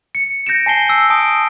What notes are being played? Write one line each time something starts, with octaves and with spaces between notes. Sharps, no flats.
C#7
G6 A#6 C#7 D7 E7
G#5 A5 C7 G7
E6
A5 D#6 D7